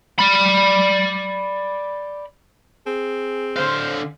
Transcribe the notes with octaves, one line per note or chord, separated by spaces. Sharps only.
D5 B5
C4 G#4
D3 C5 F5